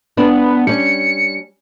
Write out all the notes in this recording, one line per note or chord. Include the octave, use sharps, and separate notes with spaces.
B3 D4
G3 C#4 C#7